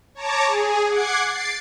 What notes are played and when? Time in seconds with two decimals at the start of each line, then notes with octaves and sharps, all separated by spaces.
0.15 C#5 A5 A#5 D6
0.46 G#4
0.88 F#5 D6 G#6 C7
1.27 A6 C7 D7